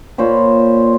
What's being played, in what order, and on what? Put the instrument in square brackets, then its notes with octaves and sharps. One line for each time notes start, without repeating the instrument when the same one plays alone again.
[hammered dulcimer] A#2 C5 C#5 B5